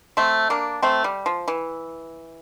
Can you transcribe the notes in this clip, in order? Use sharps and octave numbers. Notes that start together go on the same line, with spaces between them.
A3 C4
A#3 D4
A3 C4
G3
F3
E3